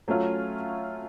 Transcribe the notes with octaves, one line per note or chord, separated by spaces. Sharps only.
F#3 A3 C#4 F4